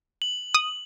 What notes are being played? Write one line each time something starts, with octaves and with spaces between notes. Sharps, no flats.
F#7
D#6